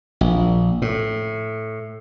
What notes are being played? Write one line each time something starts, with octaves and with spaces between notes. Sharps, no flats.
A#1
A2